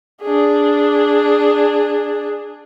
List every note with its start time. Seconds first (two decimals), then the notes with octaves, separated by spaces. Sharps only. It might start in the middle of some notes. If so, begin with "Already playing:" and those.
0.22 D4 G#4